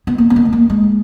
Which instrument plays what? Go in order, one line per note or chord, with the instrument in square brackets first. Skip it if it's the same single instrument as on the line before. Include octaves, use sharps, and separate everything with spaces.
[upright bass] B3
A#3
B3
A#3
G#3
A#3
G#3